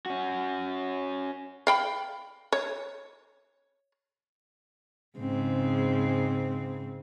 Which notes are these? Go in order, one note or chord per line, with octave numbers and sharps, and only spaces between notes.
C#4 F#4
F5 G5 B5
C#5
G#2 C#3 C4